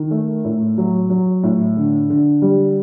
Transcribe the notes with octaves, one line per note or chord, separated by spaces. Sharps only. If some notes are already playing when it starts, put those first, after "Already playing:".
Already playing: D#3
A3
A2
F#3
F#3
A2
D3
D3
G3